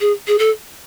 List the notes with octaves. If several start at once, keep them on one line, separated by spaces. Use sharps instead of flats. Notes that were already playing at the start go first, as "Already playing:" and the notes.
G#4
G#4
A4